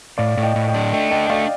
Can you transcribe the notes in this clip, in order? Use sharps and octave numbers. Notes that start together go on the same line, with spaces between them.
A2 D5 F5
A2
D#5 G5
A2
D#5 G5
D4
A3 D#5 G5
D4 D#5 G5
G5
A3 D5 F5